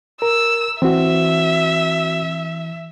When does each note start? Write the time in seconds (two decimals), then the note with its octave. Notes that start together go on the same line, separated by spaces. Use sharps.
0.22 A#4 E6
0.82 E3 C4 F#4 E5